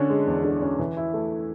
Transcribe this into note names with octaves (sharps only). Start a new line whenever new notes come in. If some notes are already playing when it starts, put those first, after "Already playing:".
Already playing: D3 C#4 D4
G#3
E2
D3
C#4
E3
E4
A3